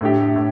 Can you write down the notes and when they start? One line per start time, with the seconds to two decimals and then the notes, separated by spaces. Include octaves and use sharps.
0.01 A2 A3 D4 G4
0.36 A2